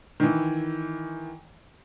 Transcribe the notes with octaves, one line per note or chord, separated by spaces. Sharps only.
D#3 E3